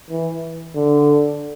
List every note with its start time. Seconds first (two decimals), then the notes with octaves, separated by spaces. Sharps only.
0.10 E3
0.76 D3